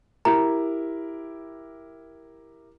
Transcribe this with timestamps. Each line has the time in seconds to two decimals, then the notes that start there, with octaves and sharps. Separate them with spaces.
0.25 E4 G4 A#4 A#5